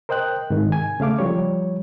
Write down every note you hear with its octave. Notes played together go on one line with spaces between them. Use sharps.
A#4 C5 D#5 G5 F#6
G#2 C3 D#3
G#5
C#3 A3 F5 D6
F3 G3 C#5